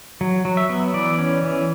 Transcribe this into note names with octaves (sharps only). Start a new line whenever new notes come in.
F#3
F#3
E5
B3
E3 D5
C#4
E3